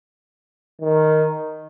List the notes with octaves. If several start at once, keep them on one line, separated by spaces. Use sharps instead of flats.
D#3